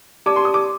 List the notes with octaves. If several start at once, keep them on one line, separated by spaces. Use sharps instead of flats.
G4 D5 A5 D6
C6
D#6
D6